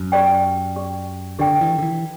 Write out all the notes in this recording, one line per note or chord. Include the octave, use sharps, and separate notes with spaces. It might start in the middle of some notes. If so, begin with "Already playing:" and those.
Already playing: F#2
G4 D5 G5
G4 D5 G5
D3 G4 D5 G5
E3
D3
E3